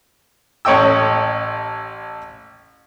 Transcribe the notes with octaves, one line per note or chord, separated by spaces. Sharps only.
A1 C#5 D#5 G5 E6